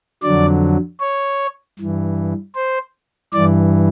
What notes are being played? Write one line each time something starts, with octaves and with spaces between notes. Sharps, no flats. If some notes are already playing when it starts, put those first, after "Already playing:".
F2 D3 F#3 D5
C#5
G2 E3
C5
G2 E3 D5